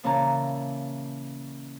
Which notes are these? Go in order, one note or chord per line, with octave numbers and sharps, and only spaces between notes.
A#2 C#3 E3 C#4 A5 A#5